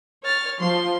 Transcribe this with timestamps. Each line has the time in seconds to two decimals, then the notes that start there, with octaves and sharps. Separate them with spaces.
0.24 C#5 F6 A6
0.60 F3 C6